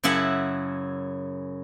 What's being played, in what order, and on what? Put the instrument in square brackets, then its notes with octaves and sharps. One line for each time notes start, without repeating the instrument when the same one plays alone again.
[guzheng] F#2 C#3 E4 E5 F#5 A5